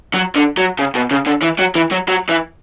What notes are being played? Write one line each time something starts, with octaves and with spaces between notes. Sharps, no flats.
F#3
D3
F#3
C#3
B2
C#3
D3
E3
F#3
E3
F#3
F#3
E3